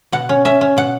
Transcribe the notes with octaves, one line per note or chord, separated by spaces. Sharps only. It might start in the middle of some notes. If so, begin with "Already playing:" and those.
B2 F#5
C#4
C#4 E5
C#4
B2 F#5